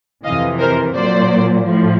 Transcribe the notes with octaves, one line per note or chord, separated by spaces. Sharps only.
F2 C3 E3 D#5 F5
A#4 C5
A#2 F#3 C5 D5
A2 F3